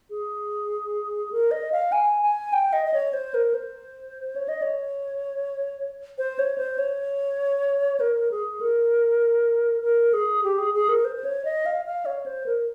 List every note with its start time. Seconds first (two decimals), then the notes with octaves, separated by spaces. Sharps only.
0.10 G#4
1.32 A#4
1.51 D#5
1.72 F5
1.92 G#5
2.23 G#5
2.53 G5
2.73 D#5
2.86 D#5
2.94 C#5
3.13 C5
3.34 A#4
3.54 C5
4.36 C#5
4.49 D#5
4.62 C#5
6.18 C5
6.39 C#5
6.58 C5
6.78 C#5
8.00 A#4
8.31 G#4
8.61 A#4
9.82 A#4
10.13 G#4
10.44 G4
10.58 G#4
10.75 G#4
10.89 A#4
11.05 C5
11.16 C5
11.25 C#5
11.45 D#5
11.66 F5
11.85 F5
12.06 C#5
12.26 C5
12.46 A#4